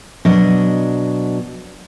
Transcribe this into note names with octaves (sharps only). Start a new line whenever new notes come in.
B2 F#3 D4 D#5